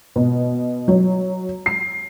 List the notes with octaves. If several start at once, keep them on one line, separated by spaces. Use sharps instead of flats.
B2
F#3
C7